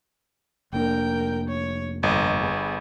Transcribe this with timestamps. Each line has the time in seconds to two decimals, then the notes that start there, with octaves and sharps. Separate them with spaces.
0.73 F1 A#3 D4 A#4 G5
1.48 C#5
2.03 G1 D#5
2.39 B3 G#4